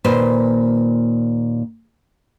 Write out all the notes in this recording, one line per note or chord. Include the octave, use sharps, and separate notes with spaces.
D#2 A#2 B4 C5